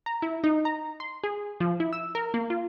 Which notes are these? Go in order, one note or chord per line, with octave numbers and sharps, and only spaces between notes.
A#5
E4
D#4
A#5
C6
G#4
F3
E4
E6
A#4
A#3
F4